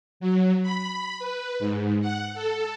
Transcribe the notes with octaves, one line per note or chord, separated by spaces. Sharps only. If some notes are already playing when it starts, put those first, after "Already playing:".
F#3
B5
B4
G#2
F#5
A4